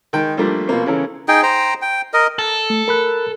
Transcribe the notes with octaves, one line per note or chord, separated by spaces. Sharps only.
D#3 G#3 G5
F3 G3 A3 A#3 D4
B2 F3 A#3 C4
C#3 E3 C#4 A4 A#4
D#4 G#4 G5
C5 G5 A#5
G5
A#4 D#5
A4
A3
A#4 B5 F#6